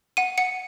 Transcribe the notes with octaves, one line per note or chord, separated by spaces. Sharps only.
F#5 D#7
F#5 C#7